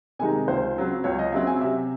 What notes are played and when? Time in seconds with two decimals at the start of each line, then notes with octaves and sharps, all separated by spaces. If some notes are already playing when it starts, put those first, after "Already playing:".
0.19 C3 D#3 G#3 D#4 G#5
0.48 C#2 C5
0.76 C#3 F#3 C4
1.04 C#2 C#5
1.19 D#5
1.32 C#3 F#3 C4 E5
1.47 G#5
1.61 C3 E5